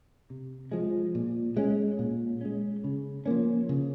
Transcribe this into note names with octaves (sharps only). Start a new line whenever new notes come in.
C3
F3 G#3
A#2
G#3 C#4
A#2
G#3 C#4
C#3
F3 A#3 C#4
C#3